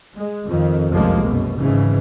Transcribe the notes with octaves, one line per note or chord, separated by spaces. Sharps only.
G#3
F2 D#3
F1 C2 F#2 F3 G#3 A#3
F#2 B2
G#1 G#2 C#3 E3